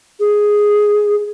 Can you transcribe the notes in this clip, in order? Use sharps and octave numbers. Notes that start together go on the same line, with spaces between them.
G#4